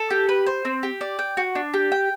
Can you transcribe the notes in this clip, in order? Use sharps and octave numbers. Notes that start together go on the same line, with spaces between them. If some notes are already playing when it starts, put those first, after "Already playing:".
Already playing: A4
G4
B4
C5
C4
G4
D5
G5
F#4
D4
G4
G5